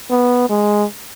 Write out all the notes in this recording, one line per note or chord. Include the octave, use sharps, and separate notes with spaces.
B3
G#3